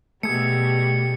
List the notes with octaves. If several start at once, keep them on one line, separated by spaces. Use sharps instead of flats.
B2 G3 A3 G#4 A4 C#7